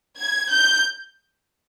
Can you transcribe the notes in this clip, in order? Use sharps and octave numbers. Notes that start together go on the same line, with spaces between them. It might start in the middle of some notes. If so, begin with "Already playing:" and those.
G#6
G6